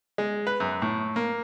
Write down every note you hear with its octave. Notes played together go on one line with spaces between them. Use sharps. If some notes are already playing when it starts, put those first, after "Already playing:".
G#3
B4
F#2
A2
A#3